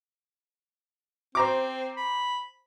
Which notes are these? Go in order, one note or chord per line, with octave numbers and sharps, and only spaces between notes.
C4 C5 A#5 D6
B5